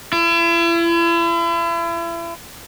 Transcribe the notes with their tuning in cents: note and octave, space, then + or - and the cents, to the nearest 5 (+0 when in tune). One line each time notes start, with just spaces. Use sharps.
E4 +40